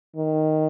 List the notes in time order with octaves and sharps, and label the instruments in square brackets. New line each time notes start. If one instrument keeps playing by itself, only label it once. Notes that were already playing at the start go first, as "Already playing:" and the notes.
[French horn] D#3